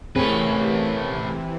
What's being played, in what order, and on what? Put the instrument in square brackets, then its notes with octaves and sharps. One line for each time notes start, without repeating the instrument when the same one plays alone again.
[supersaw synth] C3 E3 [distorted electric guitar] A3 B4 [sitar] A#3 C#4 [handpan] C4 G#4